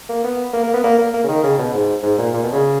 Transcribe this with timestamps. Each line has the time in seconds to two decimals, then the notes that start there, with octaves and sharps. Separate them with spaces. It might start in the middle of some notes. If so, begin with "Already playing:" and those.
0.09 A#3
0.24 B3
0.53 A#3
0.63 A#3
0.73 B3
0.84 A#3
0.98 A#3
1.14 A#3
1.24 C#3
1.28 D#3
1.43 C#3
1.58 B2
1.73 G#2
2.03 G#2
2.18 A#2
2.33 A#2
2.43 B2
2.53 C#3